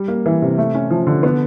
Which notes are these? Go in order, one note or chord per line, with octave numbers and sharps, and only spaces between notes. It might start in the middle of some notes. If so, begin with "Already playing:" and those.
Already playing: G3
A#3
E3
C3
A3
C#4
F3
D3
B3